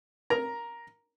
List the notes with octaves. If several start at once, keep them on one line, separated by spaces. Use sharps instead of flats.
A#4 A#5